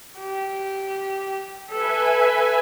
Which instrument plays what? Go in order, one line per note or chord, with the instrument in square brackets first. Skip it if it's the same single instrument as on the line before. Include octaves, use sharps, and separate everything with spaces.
[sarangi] G4
[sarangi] A4 [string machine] B4 E5 G#5